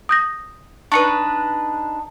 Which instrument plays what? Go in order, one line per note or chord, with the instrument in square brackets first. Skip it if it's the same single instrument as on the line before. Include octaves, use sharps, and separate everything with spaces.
[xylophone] D#6 G6 A#6
[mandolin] D4 D#4 B4 [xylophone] C#6 C#7